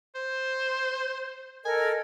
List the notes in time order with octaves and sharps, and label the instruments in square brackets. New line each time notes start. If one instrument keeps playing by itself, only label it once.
[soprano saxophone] C5
[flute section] A4 A#4 D#5 [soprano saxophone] G#5